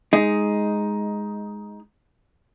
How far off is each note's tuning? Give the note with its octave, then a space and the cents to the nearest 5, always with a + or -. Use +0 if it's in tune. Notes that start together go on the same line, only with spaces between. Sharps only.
G#3 +0 D#4 +10